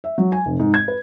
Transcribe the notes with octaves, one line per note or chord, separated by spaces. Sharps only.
E5
F#3
G#5
F1
G#2
G#6
B4